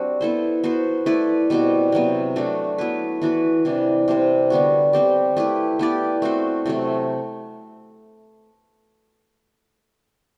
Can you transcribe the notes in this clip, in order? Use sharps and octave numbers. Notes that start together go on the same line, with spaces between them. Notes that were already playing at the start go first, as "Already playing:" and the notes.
Already playing: G3 C4 D4 F#4
B3 E4 A4 C5
B3 F#4 C5
A3 E4 B4 D5
B2 G3 C4 F#4
C3 F#3 B3
F#3 A3 D4 F#4
F#3 B3 E4 B4
E3 B3 F#4 B4
C3 E3 G3 D4
C3 G3 C4
D3 G3 B3 F#4
G3 C4 G4
A3 E4 G4 B4
B3 E4 G4 D5
A3 C4 F#4 C5
C3 F#3 A3